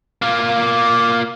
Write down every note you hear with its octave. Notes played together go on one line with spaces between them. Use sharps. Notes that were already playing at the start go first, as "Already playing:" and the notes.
A#3 F4